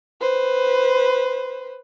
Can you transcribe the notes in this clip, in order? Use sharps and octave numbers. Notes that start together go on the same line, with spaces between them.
B4 C5